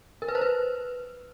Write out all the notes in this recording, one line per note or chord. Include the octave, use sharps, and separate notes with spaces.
A#4
B4
C5
B4